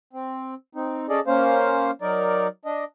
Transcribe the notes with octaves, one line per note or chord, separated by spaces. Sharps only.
C4
C4 D#4
C#4 G#4 A4 D5 D#5
A#3 C#4 C5 F5
F#3 D#4 A#4 D5
D4 D#5